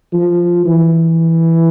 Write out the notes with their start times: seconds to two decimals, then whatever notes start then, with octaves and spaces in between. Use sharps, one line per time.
0.13 F3
0.66 E3